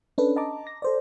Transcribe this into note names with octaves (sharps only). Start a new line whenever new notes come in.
C#4 D4 A4 B4
D#5 A5 A#5 D6
A#6
A4 C5 D5